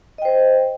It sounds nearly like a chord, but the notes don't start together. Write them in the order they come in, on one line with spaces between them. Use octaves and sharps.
D#5 G5 C5